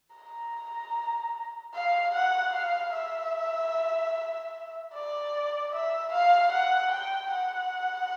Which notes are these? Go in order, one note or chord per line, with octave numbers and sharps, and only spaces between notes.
A#5
F5
F#5
F5
E5
D5
E5
F5
F#5
G5
F#5